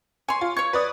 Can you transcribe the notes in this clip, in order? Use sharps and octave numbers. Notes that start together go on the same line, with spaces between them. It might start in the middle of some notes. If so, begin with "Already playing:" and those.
C#5 G#5 C6
F4
C#5 C#6 G#6
B4 D5 D#6